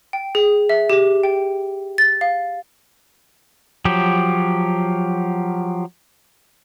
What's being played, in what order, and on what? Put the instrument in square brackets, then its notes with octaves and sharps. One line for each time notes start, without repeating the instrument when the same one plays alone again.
[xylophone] G5
G#4
E5
G4
G5
A6
F5
[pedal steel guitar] F3 F#3 G4